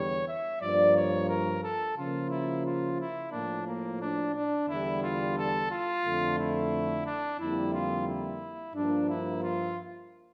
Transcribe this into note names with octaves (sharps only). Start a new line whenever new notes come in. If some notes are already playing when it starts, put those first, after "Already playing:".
Already playing: E2 D3 G3 C#5
E5
G2 F3 A#3 D5
C#5
A#4
A4
C#3 F3 A#3 F4
E4
F4
E4
A2 F3 A#3 D4
A#3
D4
D4
E2 D3 G3 E4
F4
A4
F4
F2 D3 A3
E4
D4
F2 D3 G3 A#3 E4
F4
E4
G2 F3 A#3 D4
E4
F4